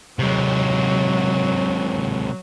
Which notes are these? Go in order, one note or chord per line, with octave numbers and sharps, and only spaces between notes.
C3 F#3 G#3